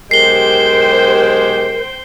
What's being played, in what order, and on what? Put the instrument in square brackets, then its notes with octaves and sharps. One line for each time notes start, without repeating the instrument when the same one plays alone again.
[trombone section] B1 G#3 G4 [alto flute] A#4 [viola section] C5 G5 [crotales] C7 G7